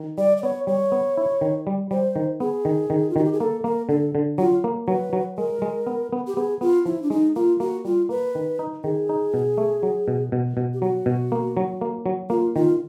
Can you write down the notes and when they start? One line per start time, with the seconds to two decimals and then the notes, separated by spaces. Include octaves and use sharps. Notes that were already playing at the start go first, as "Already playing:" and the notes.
Already playing: D#3
0.18 G3 D5
0.37 D5
0.43 B3 C#5
0.67 G3 C#5
0.92 B3
1.17 E4
1.41 D#3
1.67 G3
1.91 G3 C5
2.16 D#3
2.40 B3 G#4
2.65 D#3
2.90 D#3
3.10 F4
3.16 D#3 F#4
3.25 G4
3.33 G#4
3.40 A#3 A4
3.64 A#3 A#4
3.89 D3 A4
4.15 D3
4.38 F#3 F4
4.64 A#3
4.88 F#3 B4
5.13 F#3
5.38 G#3 A#4
5.62 G#3
5.87 B3
6.13 B3
6.27 G4
6.37 B3 G#4
6.61 B3 F4
6.86 F3 E4
7.02 D4
7.10 G#3 D#4
7.36 A#3 F4
7.60 A#3 F#4
7.85 G3 F4
8.09 A#3 B4
8.35 D#3
8.59 D#4
8.84 D#3 G#4
9.09 D#4
9.34 B2
9.58 A3
9.83 F#3
10.08 B2
10.32 B2
10.57 B2
10.74 G4
10.82 F#3 F#4
11.06 B2
11.32 A#3
11.57 F#3
11.81 A#3
12.06 F#3
12.30 A#3 F4
12.55 D#3 F4